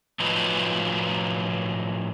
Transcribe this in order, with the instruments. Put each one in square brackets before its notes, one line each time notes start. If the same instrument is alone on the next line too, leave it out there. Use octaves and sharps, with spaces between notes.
[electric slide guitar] A2 F3 F#3 D#4 F4 B4